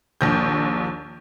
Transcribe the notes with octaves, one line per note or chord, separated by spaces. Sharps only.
A#1 D#2 G6